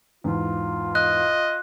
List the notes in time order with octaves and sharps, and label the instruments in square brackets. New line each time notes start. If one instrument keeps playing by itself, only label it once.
[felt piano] E2 G#2 [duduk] F4
[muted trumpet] D#5 [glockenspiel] F#6